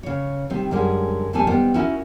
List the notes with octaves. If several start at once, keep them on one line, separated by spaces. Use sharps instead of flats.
C#3 C#5
C3 D#3 G3 C4
F#2 D3 G3 G#3
F2 D#3 G3 C4 A4 G#5
D#3 G3 B3 C4
C#4 D#4 E4 F#4 A#4